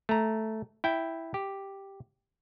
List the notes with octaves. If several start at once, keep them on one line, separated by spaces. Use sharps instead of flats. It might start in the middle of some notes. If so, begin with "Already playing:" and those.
A3 A#5
E4 G5
G4